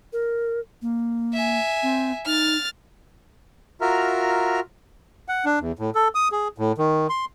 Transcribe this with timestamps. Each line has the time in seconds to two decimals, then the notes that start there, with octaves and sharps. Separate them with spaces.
0.13 A#4
0.82 A#3
1.34 E5 G#5
1.83 C4
2.26 D#4 F6 A6
3.81 F4 F#4 A#4 E5 A#5 F6
5.28 F#5
5.45 D4
5.60 E2
5.79 A2
5.95 A4
6.15 D#6
6.32 G#4
6.58 A2
6.78 D#3
7.09 C6